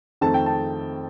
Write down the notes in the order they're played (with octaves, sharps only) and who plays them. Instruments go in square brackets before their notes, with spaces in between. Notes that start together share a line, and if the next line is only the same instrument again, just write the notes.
[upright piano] F2 D#3 A3 C4 D#4 A5
G5
A5